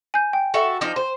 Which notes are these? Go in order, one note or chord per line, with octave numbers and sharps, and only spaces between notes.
G#5 G6
G5
F#4 A4 E5
F3 D4 D#4
C5